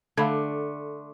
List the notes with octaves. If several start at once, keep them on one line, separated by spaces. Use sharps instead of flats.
D3 A3 F5 B5 G#6